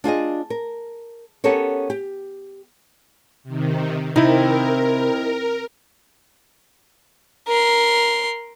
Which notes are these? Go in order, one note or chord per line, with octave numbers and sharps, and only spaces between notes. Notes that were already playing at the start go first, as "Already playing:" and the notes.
D4 F4 G#4 D#5
A#4
B3 C#4 G4 A4 A#4 C#5
G4
C3 D#3
C3 D#4 E4 A#4
A#4 C6